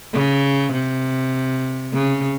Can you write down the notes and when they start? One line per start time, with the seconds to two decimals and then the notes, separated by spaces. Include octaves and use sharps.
0.13 C#3
0.73 C3
1.93 C#3